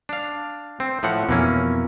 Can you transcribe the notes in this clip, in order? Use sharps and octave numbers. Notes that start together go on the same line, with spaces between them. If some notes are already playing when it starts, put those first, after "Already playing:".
D4 F5
C4
A2 F3 F#5
F2 B2 E3 A#3 C#4